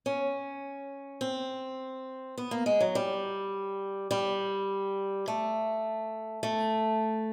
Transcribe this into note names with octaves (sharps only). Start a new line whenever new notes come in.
C#4
C4
B3
A#3
G#3
F#3
G3
G3
A3
A3